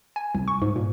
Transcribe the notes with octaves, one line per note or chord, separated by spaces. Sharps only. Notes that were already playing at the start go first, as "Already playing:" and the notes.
G#5
C2
C#6
G#2
A#2